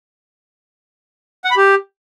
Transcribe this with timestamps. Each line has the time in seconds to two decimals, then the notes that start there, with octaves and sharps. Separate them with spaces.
1.45 F#5
1.51 B5
1.57 G4